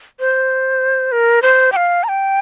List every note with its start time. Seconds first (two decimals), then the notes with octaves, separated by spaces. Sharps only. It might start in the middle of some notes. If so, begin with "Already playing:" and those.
0.20 C5
1.12 A#4
1.42 C5
1.72 G5
1.76 F5
2.04 A#5
2.08 G5